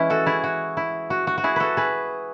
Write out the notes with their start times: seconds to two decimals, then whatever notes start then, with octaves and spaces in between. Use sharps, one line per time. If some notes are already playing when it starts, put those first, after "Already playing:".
Already playing: E3 G#3 C#4 E4 B4
0.10 F#4 A4
0.26 E4 G#4
0.44 F#4
0.77 E4
1.10 F#4
1.27 F#4
1.38 F#4
1.44 E4 G#4
1.56 F#4 A4 B4
1.77 G#4 B4